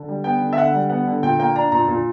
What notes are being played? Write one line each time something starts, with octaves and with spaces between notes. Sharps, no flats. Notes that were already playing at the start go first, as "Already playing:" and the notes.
Already playing: D3
G3
B3 G5
D3
E5
D3 F#5
G3
B3 F#5
D3
A#2 G5
A#3 G5
D4 A#5
A#2 A#5
A#2